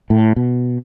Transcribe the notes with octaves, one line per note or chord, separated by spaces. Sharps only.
A2
B2